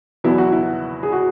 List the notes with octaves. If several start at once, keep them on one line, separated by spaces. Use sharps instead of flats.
E2 B2 F#3 E4
F#4
E4
G#4
F#4